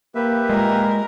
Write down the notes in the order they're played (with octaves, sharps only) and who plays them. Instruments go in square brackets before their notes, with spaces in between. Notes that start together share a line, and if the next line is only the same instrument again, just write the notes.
[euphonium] A#3 [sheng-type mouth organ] G4 B4 E5
[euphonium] A#2 [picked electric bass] G#3 [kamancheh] A#4